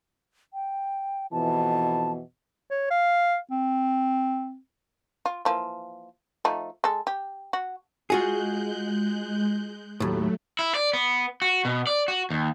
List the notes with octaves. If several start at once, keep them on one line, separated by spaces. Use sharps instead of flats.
G5
F2 B2 E3 A5
C#5
F5
C4
F4
E3 F3 A#3
F3 A3 D#4
G#3 A4
G4
F#4
G#3 F4 F#4 G#4 F#6 G6
D#2 A2 F#3 A3
E4
D5
B3
F#4
B2
D5
F#4
D#2